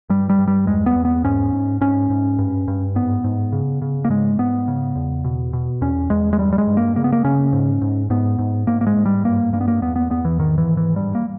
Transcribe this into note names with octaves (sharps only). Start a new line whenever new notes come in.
G2 G3
G3
G2
G3
E2 G#3
B3
E2
B3
G#2 C#4
G#2
G#2 C#4
G#2
G2
G2
G#2 B3
G#2
C#3
C#3
A#3
G#2 G#3
G#2 B3
C#3
E2
B2
B2
E2 C#4
E2 G#3
G#3
G2 G3
G3
G#3
G2
A#3
C#3 A#3
B3
A#3
C#3 C#4
G#2
G#2
G#2 B3
G#2
G#2 A#3
A#3
G#3
G#2
G3
G2 A#3
G2 A#3
B3
A#3
E2 B3
B3
E2 B3
E3
G#2 D#3
E3
G#2
E3
G2 G3
A#3